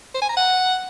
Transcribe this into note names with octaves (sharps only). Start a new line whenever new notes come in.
C5
G#5
A#5
F#5